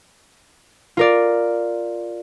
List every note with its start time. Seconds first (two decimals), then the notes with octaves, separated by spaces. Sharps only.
0.97 F4 A#4 D5